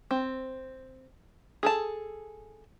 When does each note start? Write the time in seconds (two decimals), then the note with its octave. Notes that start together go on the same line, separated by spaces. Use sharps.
0.11 C4
1.63 G#4 A4 A5